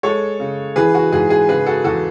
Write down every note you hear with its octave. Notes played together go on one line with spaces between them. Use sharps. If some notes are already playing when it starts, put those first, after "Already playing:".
G#3 A4 C#5
C#3
E3 G#4 B4
F#4
G#2 G#4
G#4
C#3 G#4 B4
F#4 A4
E2 F#4 A4